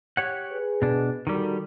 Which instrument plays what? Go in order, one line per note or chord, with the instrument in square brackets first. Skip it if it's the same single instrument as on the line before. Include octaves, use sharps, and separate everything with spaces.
[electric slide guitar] G4 C#5 F#5
[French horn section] G#4 B4
[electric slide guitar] B2 D4
[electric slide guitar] D#3 G3 [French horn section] F#4 A4 A#4